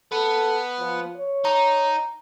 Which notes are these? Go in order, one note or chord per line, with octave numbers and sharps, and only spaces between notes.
B3 A4
F3
C#5
D#4 A#5